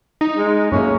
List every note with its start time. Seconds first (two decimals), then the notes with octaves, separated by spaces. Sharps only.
0.21 D#4
0.37 G#3
0.72 F#2 A2 A#3 C#4